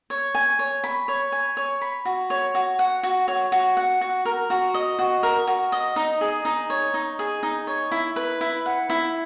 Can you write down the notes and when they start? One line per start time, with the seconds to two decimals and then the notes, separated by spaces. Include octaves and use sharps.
0.10 C#5
0.35 G#5
0.59 C#5
0.84 B5
1.08 C#5
1.32 G#5
1.57 C#5
1.81 B5
2.05 F#4
2.30 C#5
2.55 F#4
2.79 F#5
3.03 F#4
3.28 C#5
3.52 F#4
3.77 F#5
4.01 F#4
4.25 A#4
4.50 F#4
4.74 D#5
4.99 F#4
5.23 A#4
5.47 F#4
5.72 D#5
5.96 D#4
6.21 G#4
6.45 D#4
6.70 C#5
6.94 D#4
7.19 G#4
7.43 D#4
7.67 C#5
7.91 E4
8.16 B4
8.41 E4
8.66 F#5
8.90 E4